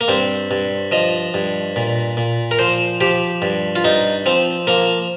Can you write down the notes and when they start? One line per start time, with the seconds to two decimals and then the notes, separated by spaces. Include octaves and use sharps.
0.01 A#3
0.08 G2 C4
0.51 G2
0.92 F3 D#5
1.34 G2
1.76 A#2
2.17 A#2
2.51 A#4
2.59 F3 C5
3.01 F3 G4
3.42 G2
3.76 F4
3.84 G2 D#4
4.26 F3 C4
4.67 F3 A#3